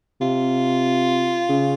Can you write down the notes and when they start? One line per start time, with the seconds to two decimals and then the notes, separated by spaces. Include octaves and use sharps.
0.21 C3 F4
1.49 C#3